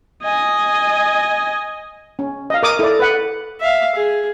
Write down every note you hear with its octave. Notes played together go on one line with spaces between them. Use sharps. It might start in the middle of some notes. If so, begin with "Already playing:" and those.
D#5 G#5
C#4
D#5 F5
A#4 D6 D#6
E4 A4 D5
B4 F#5
E5 F5
G#4